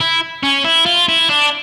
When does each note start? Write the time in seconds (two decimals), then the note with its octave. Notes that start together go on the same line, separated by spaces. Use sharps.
0.01 E4
0.43 C#4
0.65 E4
0.86 F4
1.08 E4
1.29 D4